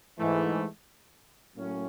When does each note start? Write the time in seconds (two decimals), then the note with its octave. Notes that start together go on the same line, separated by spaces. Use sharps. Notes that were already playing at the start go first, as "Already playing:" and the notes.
0.17 G#2 E3 A3
1.56 A2 F#3 A#3 C#4